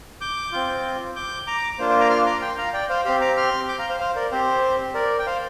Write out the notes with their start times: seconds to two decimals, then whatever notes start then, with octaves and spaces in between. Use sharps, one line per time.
0.21 D6 G6
0.52 C4 F4
1.16 D6 G6
1.47 A#5 D6
1.79 A#3 D4 F4 C5
1.89 C5
2.00 A#5 D6
2.10 C6 F6
2.26 A#5 D6
2.42 G5 C6
2.58 F5 A#5
2.74 D5 G5
2.90 C5 F5
3.05 C4 G4 C5 F5
3.21 A#5 D6
3.37 C6 F6
3.68 D6 G6
3.79 F5 A#5
3.89 C5 F5
4.00 C5 F5
4.16 A#4 D5
4.31 C4 G4 C5
4.94 A#4 D5
5.19 G5
5.26 C5 F5